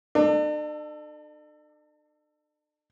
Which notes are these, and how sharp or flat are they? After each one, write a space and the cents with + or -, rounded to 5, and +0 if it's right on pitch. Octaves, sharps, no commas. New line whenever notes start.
D4 +45 A4 +10